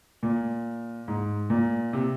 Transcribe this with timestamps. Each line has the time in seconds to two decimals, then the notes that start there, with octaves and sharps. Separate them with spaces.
0.23 A#2
1.08 G#2
1.50 A#2
1.93 C3